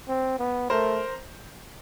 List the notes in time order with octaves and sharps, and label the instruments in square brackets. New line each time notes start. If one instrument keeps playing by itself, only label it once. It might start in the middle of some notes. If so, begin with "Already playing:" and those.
[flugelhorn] C4
B3
[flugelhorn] A3 [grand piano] A#4 C5